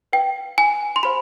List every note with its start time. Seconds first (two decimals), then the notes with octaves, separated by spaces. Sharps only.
0.13 B4 F5 G5
0.58 G#5
0.96 C6
1.03 G4 C5 F5 B5